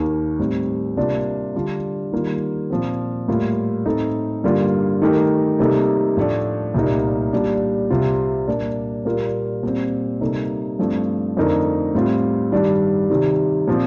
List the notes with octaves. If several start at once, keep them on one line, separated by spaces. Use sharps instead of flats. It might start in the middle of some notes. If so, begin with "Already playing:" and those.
Already playing: D#2 D#3 A#3
A2 G3 C4
C3 G3 A#3 D4 F4
D3 G3 D4 F4
D#3 G3 A#3 F4
A#2 F3 C4
A2 G3 A#3 F4
A2 A3 C4 D#4 A4
G2 D3 G3 A#3 F4
D#3 A3 D#4 G4 A#4
C3 G3 A#3 D#4 A4
A2 F3 A3 D4
C2 A#2 G3 A#3 D#4
A#2 G3 D4
C2 C3 G3 C4 F4
A#2 G3 A#3 D4
A#2 G3 A#3 F4 A#4
A#2 G3 C4
C3 G3 A#3 D#4 A4
G2 F3 A3 C4
F2 D3 A3 D#4 A#4
A2 G3 C4 F4
G2 D#3 G3 D4
C3 D#3 G3
A#2 F3 C4